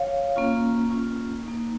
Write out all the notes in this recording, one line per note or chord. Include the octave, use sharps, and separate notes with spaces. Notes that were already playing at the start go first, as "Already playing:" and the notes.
Already playing: C#5 F5
A#3 C#4 F4
A#3 C#4 F4
A#3 D#4